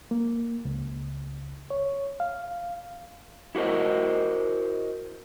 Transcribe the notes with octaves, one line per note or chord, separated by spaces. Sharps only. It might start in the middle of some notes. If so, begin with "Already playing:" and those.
A#3
C#2
C#5
F5
E4 F#4 A#4 C5 D#5